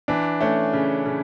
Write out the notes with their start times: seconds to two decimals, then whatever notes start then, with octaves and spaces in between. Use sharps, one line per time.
0.08 E3 D4
0.40 A3 C#4
0.73 C#3
1.06 C#3